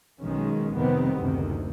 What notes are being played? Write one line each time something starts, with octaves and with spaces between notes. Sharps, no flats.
B1 D#3 G#3 C#4
F2 C3 D#3 G3 B3 C4
F#1 D2 C3 D#3